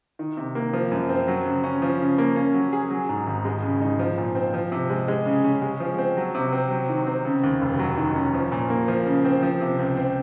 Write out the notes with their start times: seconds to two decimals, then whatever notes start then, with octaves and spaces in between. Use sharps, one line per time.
0.19 D#3
0.37 C3
0.55 A#3
0.73 F3
0.91 F#2
1.09 C4
1.28 F#3
1.46 C#3
1.64 C#4
1.82 F3
2.00 C#3
2.18 A#3
2.36 C#4
2.54 F#3
2.73 G#4
2.90 F#3
3.09 G#2
3.27 G#1
3.45 G#3
3.63 C#3
3.82 D#4
3.99 F3
4.18 A#2
4.35 C4
4.54 F3
4.72 C3
4.90 G#3
5.08 G#3
5.26 C#3
5.44 C#4
5.62 G#3
5.80 F3
5.98 C4
6.17 F#3
6.35 C3
6.53 C4
6.71 F#3
6.89 D#3
7.07 C4
7.25 C#3
7.43 D#2
7.61 F1
7.79 F#3
7.97 D#3
8.16 C#4
8.34 F3
8.52 A#2
8.70 A#3
8.88 F3
9.06 C#3
9.25 C4
9.43 F3
9.61 C3
9.79 C#2
9.97 C4